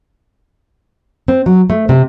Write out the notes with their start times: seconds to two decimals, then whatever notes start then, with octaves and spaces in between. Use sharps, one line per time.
1.28 C4
1.46 F#3
1.70 A3
1.89 C3